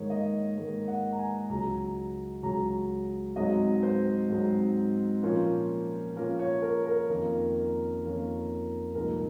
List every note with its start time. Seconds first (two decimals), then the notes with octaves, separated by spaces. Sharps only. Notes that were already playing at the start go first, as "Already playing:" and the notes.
Already playing: G#2 D#3 A#3 D#4 C#5
0.10 D#5
0.57 G#2 D#3 A#3 D#4
0.88 F#5
1.12 A#5
1.18 G#5
1.50 C#2 C#3 F#3 C#4 A#5
2.42 C#2 C#3 F#3 C#4 A#5
3.36 G#2 F#3 C4 D#4 D#5
3.83 C5
4.30 G#2 F#3 C4 D#4
5.22 A#2 F3 A#3 C#4 F4
6.15 A#2 F3 A#3 C#4 F4 A#4
6.39 C#5
6.62 A#4
6.86 A#4
7.09 F2 D#3 A#3 C#4 F4
8.02 F2 D#3 A#3 C#4 F4
8.95 C2 A#2 F3 G#3 D#4 A#4